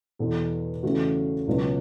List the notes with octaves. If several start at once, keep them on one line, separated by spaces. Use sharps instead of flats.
E2 B2 B3 A4
E2 C#3 A3 F#4
C#2 B2 F#3 C#4